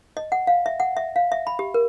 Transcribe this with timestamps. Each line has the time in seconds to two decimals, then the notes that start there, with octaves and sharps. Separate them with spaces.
0.17 D#5
0.32 F#5
0.47 F5
0.66 E5
0.80 F#5
0.97 E5
1.16 F5
1.32 E5
1.47 B5
1.59 G4
1.74 A#4